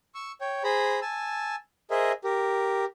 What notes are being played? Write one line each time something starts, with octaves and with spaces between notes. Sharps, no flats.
C#6 E6
C#5 G5
G#4 C5 A#5 B5
G#5 A5 E6
G#4 A#4 C5 D#5 E5
G4 A#4